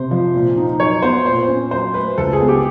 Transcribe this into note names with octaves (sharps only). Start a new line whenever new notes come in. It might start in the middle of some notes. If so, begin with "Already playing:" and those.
Already playing: C3 C5
F3
A#2
D#4
F#3 C#5
B3 C5
A#2 C5
C#4
F#3 C5
A3 B4
C#2 A4
G#4
B3
G4